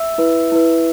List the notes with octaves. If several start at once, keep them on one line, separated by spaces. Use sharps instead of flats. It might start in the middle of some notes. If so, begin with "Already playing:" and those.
Already playing: E5 E6
E4 B4
E4 B4